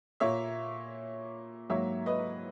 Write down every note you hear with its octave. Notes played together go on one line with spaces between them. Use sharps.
A#2 A#3 C#5 E5
G#2 F#3 A#3 C#5 E5
B4 D#5